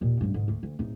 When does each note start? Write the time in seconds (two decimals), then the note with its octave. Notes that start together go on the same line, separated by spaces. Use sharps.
0.01 D#2 A#2
0.21 A1 G2
0.34 G#2 D3
0.48 D2
0.63 D2
0.79 D1 D#4